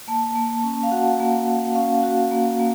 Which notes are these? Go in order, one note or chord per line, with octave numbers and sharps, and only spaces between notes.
A#3 A5
A#3
C#4
F5
F#4 F#5
A#3
A#3
C#4 F5
F#4
A#3
A#3